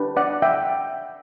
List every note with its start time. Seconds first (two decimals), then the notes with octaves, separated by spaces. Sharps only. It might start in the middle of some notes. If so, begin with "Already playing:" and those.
Already playing: D4 G4 B4
0.17 D5 F#5
0.42 E5 G5